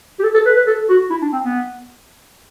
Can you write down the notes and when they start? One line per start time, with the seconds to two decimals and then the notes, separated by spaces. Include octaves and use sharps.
0.19 G4
0.23 A4
0.35 A4
0.46 B4
0.56 B4
0.67 A4
0.89 F#4
1.10 E4
1.22 D4
1.33 C4
1.43 B3